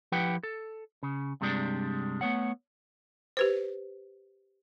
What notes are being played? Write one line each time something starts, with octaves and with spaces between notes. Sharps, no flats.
F3 E4 G4 B4 F#5 G5
A4
C#3
G2 C3 G3 G#3 D4
A3 B3 C#5 F#5
G4 B4 C5